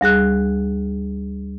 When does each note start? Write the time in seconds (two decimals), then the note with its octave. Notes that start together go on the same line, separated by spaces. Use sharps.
0.01 D2 G3 G#4 F#6